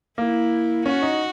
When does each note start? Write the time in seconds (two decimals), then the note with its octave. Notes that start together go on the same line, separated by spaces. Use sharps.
0.18 A#3 E4
0.86 C#4 F#4
1.02 D#4